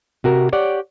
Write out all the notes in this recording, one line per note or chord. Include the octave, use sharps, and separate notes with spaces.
C3 F#4 A#4
G4 C#5 D5 F#5